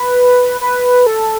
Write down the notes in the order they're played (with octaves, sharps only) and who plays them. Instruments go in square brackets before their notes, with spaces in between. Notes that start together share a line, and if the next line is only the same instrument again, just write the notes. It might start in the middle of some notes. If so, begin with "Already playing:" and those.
Already playing: [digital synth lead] B4
B4
A4